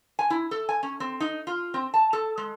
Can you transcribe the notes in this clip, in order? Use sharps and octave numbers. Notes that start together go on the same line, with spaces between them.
G#5
E4
A4
G#5
C#4
C4
D#4
F4
C4
A5
A4
G#3